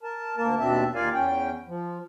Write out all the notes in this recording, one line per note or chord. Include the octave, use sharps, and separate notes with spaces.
A#4 A5
D2 A#3 A#4 A5
D#2 B2 C4 D4 E5 A5
D#2 F4 A#4 D5 F5 G#5
E2 C#4 G5
F3